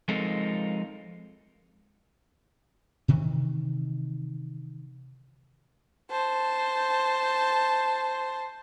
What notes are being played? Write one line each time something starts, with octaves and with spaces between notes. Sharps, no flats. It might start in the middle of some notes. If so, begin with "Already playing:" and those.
F3 G#3 C4 D#4 A4 A#4
C3 D#3 E3
C5 A5